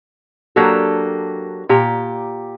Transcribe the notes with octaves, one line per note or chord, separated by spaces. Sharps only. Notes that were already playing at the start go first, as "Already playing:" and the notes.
F#3 A#3 D4 G4 A4
A#2 G4 A#5